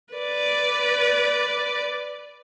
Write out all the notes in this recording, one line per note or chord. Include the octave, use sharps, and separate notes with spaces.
B4 D5